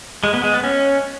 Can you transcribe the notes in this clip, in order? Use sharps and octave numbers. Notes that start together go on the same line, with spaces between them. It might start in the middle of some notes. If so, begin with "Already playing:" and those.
G#3
B3
G#3
B3
C#4